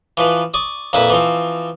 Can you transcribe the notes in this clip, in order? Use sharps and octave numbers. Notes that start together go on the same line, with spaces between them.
E3 F3 B4
D5 C#6 D#6
F2 A#2 E4 B4 E5 B5
E3 F3 C4